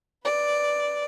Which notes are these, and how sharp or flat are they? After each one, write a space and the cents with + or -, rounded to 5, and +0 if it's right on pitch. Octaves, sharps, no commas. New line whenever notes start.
B4 +0 D5 +0